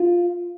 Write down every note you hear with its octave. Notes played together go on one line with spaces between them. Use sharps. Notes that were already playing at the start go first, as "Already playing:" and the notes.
Already playing: F4